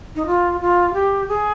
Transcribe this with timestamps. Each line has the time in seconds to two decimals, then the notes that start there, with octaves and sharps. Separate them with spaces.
0.16 D#4
0.27 F4
0.61 F4
0.94 G4
1.28 G#4